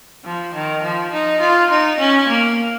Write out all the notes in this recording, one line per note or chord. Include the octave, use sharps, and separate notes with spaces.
F3
D#3
F3
D#4
F4
D#4
C#4
A#3